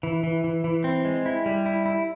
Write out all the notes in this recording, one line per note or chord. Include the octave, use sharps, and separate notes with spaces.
E3
E3
E3
E3
C4
G#3
E4
G3
E4
E4